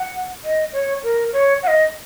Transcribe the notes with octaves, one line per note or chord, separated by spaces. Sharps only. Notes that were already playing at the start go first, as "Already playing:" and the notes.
Already playing: F#5
D#5
C#5
A#4
C#5
F#5
D#5